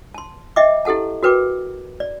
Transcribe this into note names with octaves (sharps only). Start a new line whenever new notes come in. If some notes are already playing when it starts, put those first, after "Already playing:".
A5 C6
D#5 E5 G5 D6
E4 G4 A4 F#5 A5
F#4 A#4 B4 G5 D6
D5